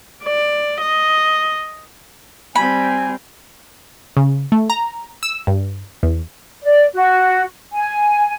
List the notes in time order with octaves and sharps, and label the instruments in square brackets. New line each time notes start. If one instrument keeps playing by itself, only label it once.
[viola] D5
D#5
[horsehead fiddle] G3 C4 [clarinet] G#5 [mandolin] B5
[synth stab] C#3
A3
A#5
E6
G2
E2
[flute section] D5
F#4
G#5